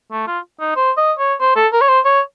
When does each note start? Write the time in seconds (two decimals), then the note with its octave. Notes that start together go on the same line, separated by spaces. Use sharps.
0.12 A3
0.28 F4
0.60 D#4
0.76 C5
0.97 D#5
1.19 C#5
1.40 C5
1.56 A4
1.73 A#4
1.81 C#5
1.89 C5
2.05 C#5